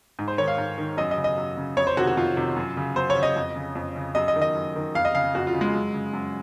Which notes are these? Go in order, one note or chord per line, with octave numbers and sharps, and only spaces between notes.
G#2
C5
D#3 C#5
F5
G#2
D#3
F#2 D#5
D#5
C#3
D#5
F#2
C#3
F2 C#5
C5
C3 D#3 F#4
F#4
F2 F4
C3 D#3
F#2
C#3
F#2 C5
C#5
C#3
D#5
F2
C#3
F2
C#3
F#2 D#5
D#5
D#3
D#5
F#2
D#3
F2 F5
D#5
C#3 F5
F2 F#4
F4
C#3
G#3
F#2
C#3
F#2